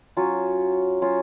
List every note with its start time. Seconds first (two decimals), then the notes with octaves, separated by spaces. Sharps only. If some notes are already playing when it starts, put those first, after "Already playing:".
0.17 F#3 C#4 F4
1.02 F#3 C#4 F4